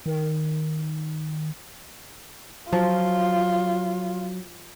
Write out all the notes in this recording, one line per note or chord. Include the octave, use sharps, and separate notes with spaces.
D#3
F3 F#3 F4